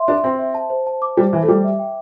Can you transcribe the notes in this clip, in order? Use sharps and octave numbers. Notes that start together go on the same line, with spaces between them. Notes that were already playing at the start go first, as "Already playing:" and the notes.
Already playing: E5 C6
D4 G4
C4 C5
E5
A5
C5
A5
D6
G3 C5
E3 A5
A3
G3 D6
E5
G5